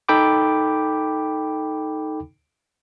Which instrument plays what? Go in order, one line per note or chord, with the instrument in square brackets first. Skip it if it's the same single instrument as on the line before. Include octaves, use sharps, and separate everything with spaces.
[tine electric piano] D#4 A4 G5 B5 D6